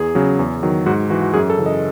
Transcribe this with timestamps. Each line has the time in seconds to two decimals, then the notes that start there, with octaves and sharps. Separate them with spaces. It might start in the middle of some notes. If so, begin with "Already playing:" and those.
Already playing: E2 G#4
0.15 C#3 F#3
0.39 E2
0.63 D#3 F#3
0.86 G#2 F#4
1.10 E3 F#4
1.22 F#4
1.34 F#2 G#4
1.50 A4
1.58 C#3 E3
1.66 D#5